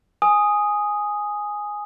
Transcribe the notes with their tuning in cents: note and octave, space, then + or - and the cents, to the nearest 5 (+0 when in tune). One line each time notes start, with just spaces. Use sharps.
G#5 +0 D#6 +0